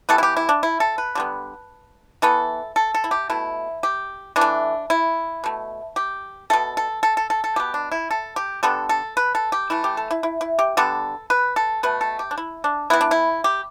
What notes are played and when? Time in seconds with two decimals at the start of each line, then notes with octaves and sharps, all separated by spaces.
0.09 E3 G3 B3 A4
0.18 E4
0.23 G4
0.37 E4
0.49 D4
0.63 E4
0.80 A4
0.98 B4
1.15 D3 G3 B3
2.22 E3 B3 A4
2.76 A4
2.94 A4
3.04 E4
3.11 G4
3.30 B2 A3 E4
3.83 G4
4.36 E3 D4
4.41 A3
4.90 E4
5.44 B2 A3
5.96 G4
6.50 B2 A3 A4
6.77 A4
7.03 A4
7.17 A4
7.30 A4
7.44 A4
7.56 B2 B3 G4
7.74 D4
7.92 E4
8.11 A4
8.36 G4
8.63 D3 G3 B3 A4
8.89 A4
9.17 B4
9.35 A4
9.52 G4
9.70 E3 A3 E4
9.84 G4
9.97 A4
10.11 E4
10.23 E4
10.41 E4
10.59 G4
10.77 D3 G3 B3 A4
11.30 B4
11.56 A4
11.83 B2 A3 B4
12.01 A4
12.19 G4
12.31 D4
12.38 E4
12.64 D4
12.90 E3 B3 E4
13.01 D4
13.11 E4
13.44 G4